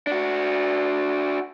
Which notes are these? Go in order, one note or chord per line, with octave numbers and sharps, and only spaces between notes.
D4 F#4